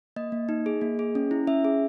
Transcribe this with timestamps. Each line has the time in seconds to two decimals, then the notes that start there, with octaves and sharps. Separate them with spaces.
0.16 A#3 D#5
0.32 A#3
0.49 D#4
0.66 G#4
0.81 A#3
0.99 G#4
1.15 C#4
1.31 E4
1.47 C#4 E5
1.64 G#4